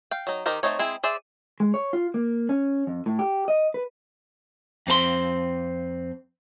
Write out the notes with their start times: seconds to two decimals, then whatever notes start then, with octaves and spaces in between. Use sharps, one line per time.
0.11 F5 G5
0.27 F#3 D#4
0.46 D#3 D#4 G4 A#4 C5
0.63 A3 C4 D#4 C#5
0.79 G#3 C4 E4 G#4
1.03 G#4 C5 D5 E5
1.60 G#3
1.74 C#5
1.93 F4
2.14 A#3
2.49 C#4
2.87 F2
3.06 A2
3.19 G4
3.48 D#5
3.74 B4
4.87 F2 C4 A4 C6